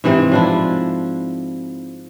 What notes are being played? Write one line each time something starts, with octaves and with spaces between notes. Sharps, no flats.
G#2 C3 E3 C4
F3 D4 E4